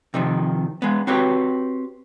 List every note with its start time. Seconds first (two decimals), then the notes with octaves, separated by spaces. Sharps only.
0.14 C3 D#3 F3
0.82 G#3 B3
1.07 C4 F#4 G4 B4 C#5